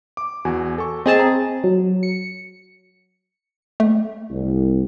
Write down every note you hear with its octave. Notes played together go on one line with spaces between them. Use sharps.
D6
E2 F#4 G#5
A4 C#6
C4 G#4 D#5 G#5 A5
A#5
F#3
C#7
A3
C2